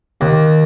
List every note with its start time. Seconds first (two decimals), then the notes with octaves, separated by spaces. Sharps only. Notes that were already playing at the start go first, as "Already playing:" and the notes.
0.21 D#2